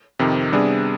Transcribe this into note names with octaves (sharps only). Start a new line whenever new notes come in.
F2 C3 D#3
C3 G3 B3 D4 G#4